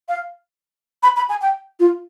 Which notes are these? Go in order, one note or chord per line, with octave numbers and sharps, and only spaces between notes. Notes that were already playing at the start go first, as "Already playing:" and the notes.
F5
B5
B5
G#5
G5
F4